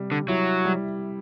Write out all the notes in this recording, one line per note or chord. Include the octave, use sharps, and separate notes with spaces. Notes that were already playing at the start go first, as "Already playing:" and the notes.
Already playing: C3 G3
D3
F#3 E4
G3